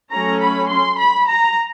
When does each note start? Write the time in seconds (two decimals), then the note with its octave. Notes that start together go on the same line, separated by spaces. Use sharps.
0.12 F#3 A3 C#4 A#5
0.41 B5
0.69 C6
0.98 B5
1.27 A#5